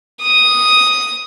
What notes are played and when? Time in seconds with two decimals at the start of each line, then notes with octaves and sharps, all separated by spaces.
0.22 D#6